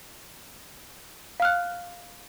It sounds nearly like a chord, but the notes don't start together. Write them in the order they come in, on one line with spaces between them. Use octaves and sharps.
F5 F6 F#6